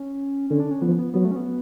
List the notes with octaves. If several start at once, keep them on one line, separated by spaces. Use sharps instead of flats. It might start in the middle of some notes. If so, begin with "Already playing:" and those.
Already playing: C#4
D3 C#4
D4
C#4
F3 B3
B3
F#3 B3
A3
C#4
B3